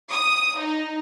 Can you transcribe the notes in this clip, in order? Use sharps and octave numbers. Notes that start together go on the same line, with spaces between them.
D#6
D#4